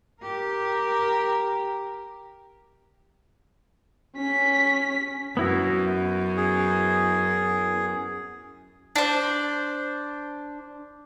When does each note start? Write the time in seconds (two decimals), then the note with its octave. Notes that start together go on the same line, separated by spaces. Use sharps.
0.22 G4 A#4
4.17 C#4 B6
5.37 F#2 B3 E4 F#4
6.37 G#4
8.96 D4 C5